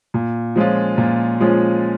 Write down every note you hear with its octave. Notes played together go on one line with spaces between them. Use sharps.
A#2
F3 G#3 C#4 F4
A#2
F3 G#3 C#4 F4